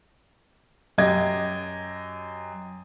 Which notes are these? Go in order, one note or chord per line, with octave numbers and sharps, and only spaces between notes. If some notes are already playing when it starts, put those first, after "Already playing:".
F#2 G4 D#5 G#6